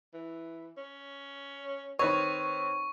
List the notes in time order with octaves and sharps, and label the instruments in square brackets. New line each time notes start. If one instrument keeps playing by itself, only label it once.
[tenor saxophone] E3
C#4
[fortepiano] D#3 B4 C#5 [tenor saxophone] C4 [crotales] C#6